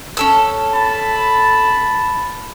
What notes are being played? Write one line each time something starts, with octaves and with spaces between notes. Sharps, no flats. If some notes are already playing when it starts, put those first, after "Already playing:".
C#4 A4 E6
A5 B5